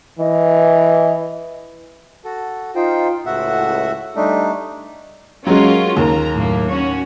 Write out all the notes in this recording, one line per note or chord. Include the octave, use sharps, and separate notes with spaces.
E3 D#5
F#4 A4
D#4 F4 C5 G5
C#2 A2 F#4 E5 F#5
G3 A3 D4 D#4
F#3 G#3 C#4 F4 A#4
D#2 A#4 A#5
F#2 A2 A#3
C#4 F#4 C#5